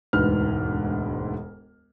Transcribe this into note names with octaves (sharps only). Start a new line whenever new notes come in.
E1 D2 G#2 B4 F6